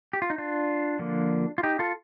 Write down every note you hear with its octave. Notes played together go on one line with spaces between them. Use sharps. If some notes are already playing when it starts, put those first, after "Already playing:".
G4
F4
D#4
D4 F4
D3 F3 A#3
F4
D#4 G4
F4 A4